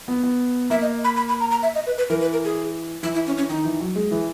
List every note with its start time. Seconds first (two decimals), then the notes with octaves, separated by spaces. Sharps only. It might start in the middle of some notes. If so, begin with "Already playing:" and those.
0.08 B3
0.23 B3
0.70 A#3 E5
0.82 D#5
1.04 B5
1.16 B5
1.28 B5
1.40 A#5
1.51 A#5
1.63 E5
1.75 D#5
1.86 B4
1.98 B4
2.10 E3 A#4
2.21 B4
2.33 A#4
2.45 G#4
3.03 E3 E4
3.15 E4
3.27 C#4
3.37 C#4
3.49 D#3 D#4
3.65 E3
3.81 F#3
3.95 G#3
4.11 E3